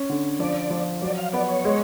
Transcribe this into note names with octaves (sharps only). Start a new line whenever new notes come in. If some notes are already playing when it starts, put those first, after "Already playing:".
Already playing: C#4
D3
F3 D5
F3
F#3 D5
F5
B3 D5
C#5
G#3